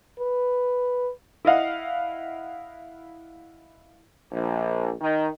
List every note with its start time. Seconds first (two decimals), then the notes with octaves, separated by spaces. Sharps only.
0.19 B4
1.45 E4 D#5 F5 F#5
4.31 A#1
5.01 D#3